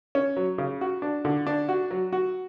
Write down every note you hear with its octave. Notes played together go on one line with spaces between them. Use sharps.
C#4
F#3
C#3
F#4
D4
D3
D4
F#4
F#3
F#4